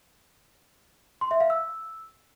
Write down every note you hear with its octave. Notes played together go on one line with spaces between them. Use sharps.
C6
E5
F5
E6